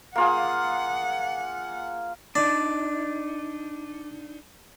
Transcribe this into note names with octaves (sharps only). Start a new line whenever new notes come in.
A#3 F4 G#4 F#5
D4 D#4 D5